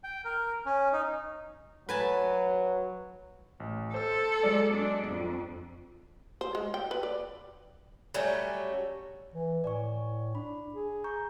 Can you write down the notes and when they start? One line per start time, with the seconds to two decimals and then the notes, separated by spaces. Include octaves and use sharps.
0.04 G5
0.25 A#4
0.65 C#4
0.93 D#4
1.89 F#3 B4 G#5 A5
3.60 A1
3.94 A4 C5 E6
4.43 F#3 G#3 D5
4.73 D4
5.07 F2
6.41 C5
6.55 G#3
6.74 G5
6.91 B4
7.03 D5
8.14 F#3 G3 A3 C#4
9.34 E3
9.64 A2 D5 G#5 C#6
10.35 D4 B5
10.74 G#4
11.04 A#5 C#6 G6